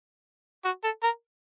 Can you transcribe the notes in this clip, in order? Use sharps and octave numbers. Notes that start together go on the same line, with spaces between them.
F#4
A4
A#4